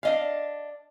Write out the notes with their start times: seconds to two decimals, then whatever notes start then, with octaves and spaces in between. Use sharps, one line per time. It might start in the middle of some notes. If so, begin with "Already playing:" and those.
0.03 D4 D#5 F5